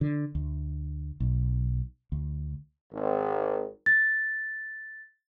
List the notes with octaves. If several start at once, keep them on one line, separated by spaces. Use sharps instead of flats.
D3
D2
B1
D2
G#1
A6